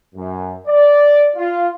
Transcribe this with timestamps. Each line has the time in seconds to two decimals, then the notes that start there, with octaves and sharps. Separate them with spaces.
0.15 F#2
0.67 D5
1.36 F4